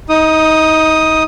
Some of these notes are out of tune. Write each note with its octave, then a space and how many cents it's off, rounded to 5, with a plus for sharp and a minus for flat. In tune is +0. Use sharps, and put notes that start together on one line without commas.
D#4 +25 D#6 +0